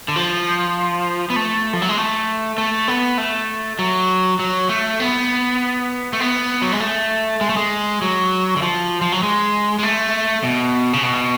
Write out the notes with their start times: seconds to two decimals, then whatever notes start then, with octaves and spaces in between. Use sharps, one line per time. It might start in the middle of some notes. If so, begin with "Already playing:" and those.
0.08 D3
0.16 F3
1.30 B3
1.36 A3
1.73 F3
1.82 F#3
1.89 G#3
1.97 A3
2.58 A3
2.88 B3
3.18 A3
3.79 F#3
4.39 F#3
4.69 A3
5.00 B3
6.13 A3
6.20 B3
6.62 F#3
6.72 G#3
6.80 A3
7.41 G#3
7.49 A3
7.57 G#3
8.02 F#3
8.56 D3
8.62 F3
9.02 F3
9.12 F#3
9.23 G#3
9.79 G#3
9.83 A3
10.44 B2
10.93 C#3
11.03 B2